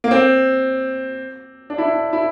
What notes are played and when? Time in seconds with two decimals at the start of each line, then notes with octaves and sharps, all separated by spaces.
0.04 A#3
0.11 C4
1.70 D4
1.78 E4
1.85 D4
2.13 E4